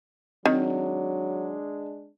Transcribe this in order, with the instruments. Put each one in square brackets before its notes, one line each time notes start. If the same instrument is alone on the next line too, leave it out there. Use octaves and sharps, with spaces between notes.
[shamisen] D#3 [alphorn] F#3 [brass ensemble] G#3 D4 [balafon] C4